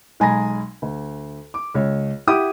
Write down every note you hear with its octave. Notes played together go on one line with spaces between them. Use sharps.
B1 G#3 G#5 A#5 B5 A#6
D2
D6
C#2 C#5
E4 G4 F#5 G5 D6 D#6